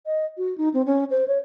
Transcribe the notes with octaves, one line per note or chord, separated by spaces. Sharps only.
D#5
F#4
D#4
C4
C#4
C5
C#5